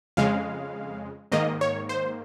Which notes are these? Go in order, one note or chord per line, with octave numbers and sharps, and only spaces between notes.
F2 C#3 G#3 F5
G#2 D#3 A#3 D#5
C#5
C5